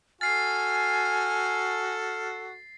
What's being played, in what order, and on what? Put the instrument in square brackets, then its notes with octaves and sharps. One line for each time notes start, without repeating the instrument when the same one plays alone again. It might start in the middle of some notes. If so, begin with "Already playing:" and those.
[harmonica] F#4 A4 [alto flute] G#5 [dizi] F6 [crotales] A6 C7